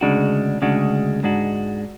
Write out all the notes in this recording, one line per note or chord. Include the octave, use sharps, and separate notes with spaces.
D2 C#3 G#3 D4 F#4
D2 C#3 G#3 D4 F#4
G#2 G#3 D4 F#4